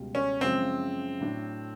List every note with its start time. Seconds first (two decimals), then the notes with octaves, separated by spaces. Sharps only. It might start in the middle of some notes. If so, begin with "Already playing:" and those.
Already playing: C#2 B2 G3
0.15 C#4
0.41 F#2 C#3 F3 G#3 C4 C#4
1.20 A2 F#3 A3 D4